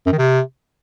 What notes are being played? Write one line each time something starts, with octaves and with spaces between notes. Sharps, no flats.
F#2
D#3
C3